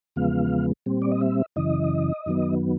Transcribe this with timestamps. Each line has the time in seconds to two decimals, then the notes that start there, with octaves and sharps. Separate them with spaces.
0.16 E2 C#3 F3 G#3 B3 F5
0.86 A#2 G3 C4
1.02 D5
1.12 D#5
1.21 E5
1.56 F#2 C#3 E3 D#5
2.26 F#2 D#3 F#3 B3